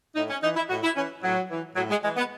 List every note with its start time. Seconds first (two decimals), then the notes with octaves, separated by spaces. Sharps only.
0.15 A2 D#4
0.29 C#4
0.42 E3 D#4
0.55 E4
0.69 A2 F#4
0.83 E4
0.96 E3 C#4
1.23 A2 F#3
1.50 E3
1.76 A2 F#3
1.90 G#3
2.02 E3 G#3
2.16 B3